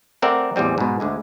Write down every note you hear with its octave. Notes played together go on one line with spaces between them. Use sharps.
A3 C4 A#4 D5 E5 F#5
A1 E2 G3 C4
G#2 B2
D2 D3 G#3